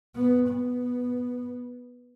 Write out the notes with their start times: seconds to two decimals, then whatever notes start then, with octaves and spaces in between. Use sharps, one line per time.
0.15 B3
0.49 B3